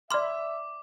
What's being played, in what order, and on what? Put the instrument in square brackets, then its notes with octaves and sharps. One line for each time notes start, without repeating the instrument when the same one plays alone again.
[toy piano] D5 B5 [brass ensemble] E5 [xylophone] C6 F6 [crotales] D6